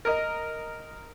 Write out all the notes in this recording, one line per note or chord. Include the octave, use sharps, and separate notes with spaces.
A#4 D#5